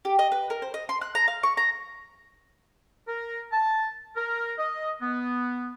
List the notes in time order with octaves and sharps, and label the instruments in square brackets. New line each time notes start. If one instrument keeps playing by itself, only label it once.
[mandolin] G4
D#5
B4
A#4
C5
D#5
C6
F#6
A#5
F5
C#6
A#5
[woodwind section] A#4
A5
A#4
D#5
B3